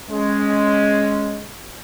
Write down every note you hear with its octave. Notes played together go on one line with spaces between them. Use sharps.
G#3 C#4